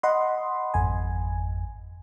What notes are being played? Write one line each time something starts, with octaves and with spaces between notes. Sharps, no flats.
D#5 F#5 B5 C6
G#1 F2 G#5